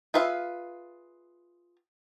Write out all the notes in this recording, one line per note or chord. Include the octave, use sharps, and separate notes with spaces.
F4 G#4 B4 E5 F5